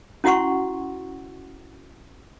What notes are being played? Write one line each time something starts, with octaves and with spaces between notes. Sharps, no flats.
C#4 E4 F#4 F#5 C6 C#6